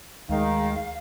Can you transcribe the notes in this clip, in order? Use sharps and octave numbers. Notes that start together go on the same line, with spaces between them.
D2 D#3 G#3 F5